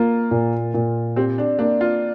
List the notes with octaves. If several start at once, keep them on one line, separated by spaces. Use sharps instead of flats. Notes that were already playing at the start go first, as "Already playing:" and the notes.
Already playing: A#3 F4
A#2
A#2
C4 G4
D4
A#3 D4
F4